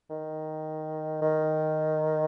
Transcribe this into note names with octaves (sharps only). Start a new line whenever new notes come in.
D#3
D#3